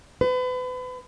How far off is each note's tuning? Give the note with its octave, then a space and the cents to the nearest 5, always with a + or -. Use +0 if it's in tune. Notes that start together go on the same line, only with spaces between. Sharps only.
B4 +35